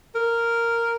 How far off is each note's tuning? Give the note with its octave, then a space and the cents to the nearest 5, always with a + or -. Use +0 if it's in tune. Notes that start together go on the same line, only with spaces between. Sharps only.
A#4 -5